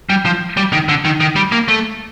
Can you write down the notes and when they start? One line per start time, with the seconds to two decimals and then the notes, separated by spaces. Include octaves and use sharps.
0.10 G3
0.25 F3
0.57 G3
0.73 D#3
0.89 D3
1.05 D#3
1.20 D#3
1.36 G3
1.52 A#3
1.68 A3